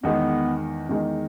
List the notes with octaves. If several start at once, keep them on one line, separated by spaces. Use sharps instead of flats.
E2 D#3 G#3 B3 D#4
E2 D#3 G#3 D#4